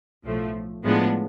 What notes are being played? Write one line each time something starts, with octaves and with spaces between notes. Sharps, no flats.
B1 A2 F3 A3
A2 F3 G#3 B3 D4